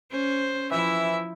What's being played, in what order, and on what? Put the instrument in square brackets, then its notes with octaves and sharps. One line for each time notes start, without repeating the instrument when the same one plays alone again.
[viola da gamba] C#4 [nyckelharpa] C5
[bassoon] E3 [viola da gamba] F3 E4 [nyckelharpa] E5